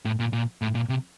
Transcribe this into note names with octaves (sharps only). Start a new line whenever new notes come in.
A2
A#2
A#2
A2
A#2
C3